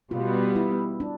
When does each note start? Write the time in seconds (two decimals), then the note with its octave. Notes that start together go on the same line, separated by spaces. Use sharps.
0.11 B2 G3 B3 F4
0.56 E4
1.00 D4